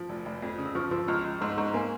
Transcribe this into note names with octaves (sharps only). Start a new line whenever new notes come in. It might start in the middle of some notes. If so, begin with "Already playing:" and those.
Already playing: F3
F1
F1
F2
C#3
E6
F3 C#6 F6
F3 C6 E6
C#2 C#6 F6
C#2
G#2 C6 E6
G#2 A#5 C#6
A#3 G#5 C6